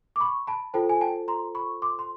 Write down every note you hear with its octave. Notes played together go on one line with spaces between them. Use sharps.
D6
B5 C#6
A5 B5
F4 A4 C5 G5 A5
G#5
G5 A5
A#5 C6
B5 C#6
C6 D6
C6